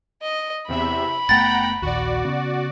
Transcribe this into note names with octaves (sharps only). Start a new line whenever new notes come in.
D#5
E2 C3 E5 B5
F#1 A3 B3 F#5 G5 A#5 A6
A#1 D#2 F#4 D5
C#3 B3 C#4